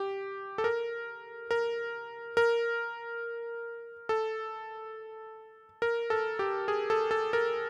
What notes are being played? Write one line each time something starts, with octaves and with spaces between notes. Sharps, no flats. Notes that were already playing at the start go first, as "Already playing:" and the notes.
Already playing: G4
A4
A#4
A#4
A#4
A4
A#4
A4
G4
G#4
A4
A4
A#4